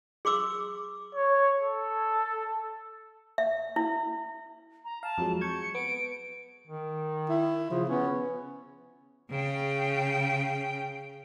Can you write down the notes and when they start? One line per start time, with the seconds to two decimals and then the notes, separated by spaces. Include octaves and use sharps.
0.25 G#4 C6 D6 E6
1.15 C#5
1.60 A4
3.38 E5
3.76 E4
4.84 A#5
5.03 F5 A5
5.18 F2 F#3 G#3
5.41 C#6 G6 G#6 C#7
5.75 B3 D7
6.67 D#3
7.29 E4
7.70 C#3 F3
7.89 B3 C#4
9.30 C#3 G5